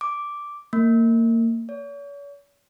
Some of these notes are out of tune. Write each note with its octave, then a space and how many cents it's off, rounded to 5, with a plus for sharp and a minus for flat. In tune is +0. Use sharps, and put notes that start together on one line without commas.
D6 -5
A#3 -30
C#5 +40